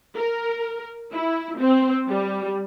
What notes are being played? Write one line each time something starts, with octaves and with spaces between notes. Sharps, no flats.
A#4
E4
C4
G3